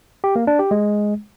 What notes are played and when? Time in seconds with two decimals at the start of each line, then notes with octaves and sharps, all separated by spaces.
0.24 G4
0.36 A#3
0.47 D4
0.59 G4
0.71 G#3